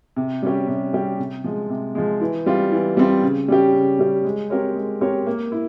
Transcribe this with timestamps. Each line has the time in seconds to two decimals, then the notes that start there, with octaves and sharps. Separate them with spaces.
0.16 C3
0.42 G3 C#4 G4
0.68 C3
0.93 G3 C#4 G4
1.19 C3
1.44 F3 G#3
1.70 C3
1.95 F3 G#3
2.21 E3
2.46 G3 C4 F4
2.72 E3
2.97 G3 C4 F4
3.22 C#3
3.48 G3 C#4 G4
3.74 C#3
3.99 G3 C#4 G4
4.24 G#3
4.50 C4 G4 A#4 C#5
4.76 G#3
5.01 C4 G4 A#4 C#5
5.26 A#3
5.52 E4